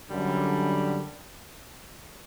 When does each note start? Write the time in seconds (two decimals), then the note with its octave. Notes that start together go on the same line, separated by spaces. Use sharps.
0.10 F#2 D3 G3